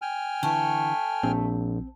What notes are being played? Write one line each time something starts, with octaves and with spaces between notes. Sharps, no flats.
G5 G#5 F6
D3 E3 A3
A#1 C4